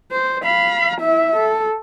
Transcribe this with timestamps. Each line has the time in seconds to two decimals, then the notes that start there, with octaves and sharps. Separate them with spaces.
0.12 C5
0.44 F5 B5
1.00 E4 E5
1.36 A4